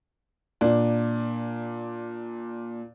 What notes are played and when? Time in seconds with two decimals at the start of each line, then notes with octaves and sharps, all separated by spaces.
0.61 A#2 D4